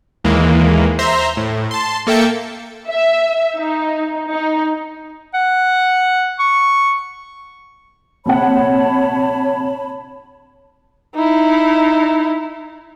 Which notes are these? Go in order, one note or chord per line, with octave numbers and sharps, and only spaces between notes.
D#2 E3 G#3 A#3
C5 E5 A#5 C6
A2
A5 C6
A#3 A4 E5 G5 A5 C#7
E5
D#4
D#4
F#5
C#6
A#1 C3 C#5 F#5 A5 B5
D#4 E4